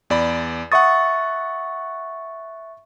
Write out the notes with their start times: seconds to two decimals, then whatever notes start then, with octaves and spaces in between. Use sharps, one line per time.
0.10 E2 D5 B5
0.72 E5 F#5 C#6 D#6 A6